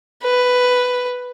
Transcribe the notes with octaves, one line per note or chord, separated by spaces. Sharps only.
B4